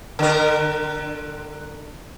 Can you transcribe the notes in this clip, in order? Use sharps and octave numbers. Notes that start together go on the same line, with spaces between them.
D3 A#4